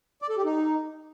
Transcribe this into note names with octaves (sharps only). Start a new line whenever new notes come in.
D5
A4
G4
D#4